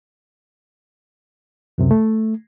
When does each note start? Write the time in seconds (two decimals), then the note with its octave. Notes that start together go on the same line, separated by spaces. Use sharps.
1.78 C#2 F#2 C3
1.91 A3